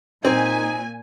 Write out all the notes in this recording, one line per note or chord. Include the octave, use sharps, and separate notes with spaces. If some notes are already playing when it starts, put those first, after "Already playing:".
A#2 C4 D#4 G#5